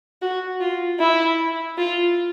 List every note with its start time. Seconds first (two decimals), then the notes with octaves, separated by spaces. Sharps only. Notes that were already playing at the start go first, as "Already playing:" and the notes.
0.22 F#4
0.61 F4
1.00 E4
1.77 F4